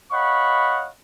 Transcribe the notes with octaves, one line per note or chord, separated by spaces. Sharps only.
C#5 D#5 F5 F#5 B5 C#6